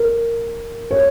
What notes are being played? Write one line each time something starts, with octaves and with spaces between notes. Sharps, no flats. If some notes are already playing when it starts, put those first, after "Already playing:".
Already playing: A#4
C#5